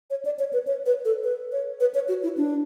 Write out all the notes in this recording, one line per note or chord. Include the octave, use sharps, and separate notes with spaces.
C#5
D5
C#5
B4
C#5
B4
A4
B4
C#5
B4
C#5
F#4
E4
D4